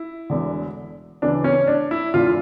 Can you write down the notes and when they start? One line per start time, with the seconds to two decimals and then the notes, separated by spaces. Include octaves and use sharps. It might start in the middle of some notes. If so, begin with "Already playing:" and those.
Already playing: E4
0.30 E1 E2 D3
1.22 D2 C#3 E3 D4
1.44 C#4
1.67 D4
1.91 E4
2.14 E1 E2 D3 F4